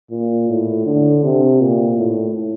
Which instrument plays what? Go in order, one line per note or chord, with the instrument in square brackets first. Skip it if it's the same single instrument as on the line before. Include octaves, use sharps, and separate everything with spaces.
[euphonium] A#2
A2
D3
C3
A#2
A2